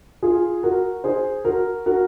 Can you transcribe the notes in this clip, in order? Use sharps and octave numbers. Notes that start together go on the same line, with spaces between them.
F4 G#4
F#4 A#4
G#4 C5
F#4 A#4
F#4 A#4